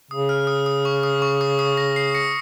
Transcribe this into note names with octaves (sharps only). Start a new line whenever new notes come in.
C#3 D#6
F6
D#6
D#6
C#6
D#6
C#6
D#6
D#6
A#6
C7
A#6 C#7